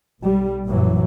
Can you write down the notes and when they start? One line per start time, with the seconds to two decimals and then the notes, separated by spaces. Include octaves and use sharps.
0.22 B1 G3
0.67 A#1 F#2 A2 E3 F#3